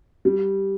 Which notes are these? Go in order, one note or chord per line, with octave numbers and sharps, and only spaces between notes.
G3